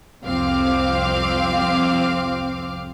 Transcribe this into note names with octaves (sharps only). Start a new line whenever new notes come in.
C2 F2 C4 F5 D6